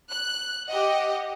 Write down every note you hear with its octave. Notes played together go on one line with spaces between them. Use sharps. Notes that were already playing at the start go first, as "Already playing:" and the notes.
F#6
G4 D#5 F#5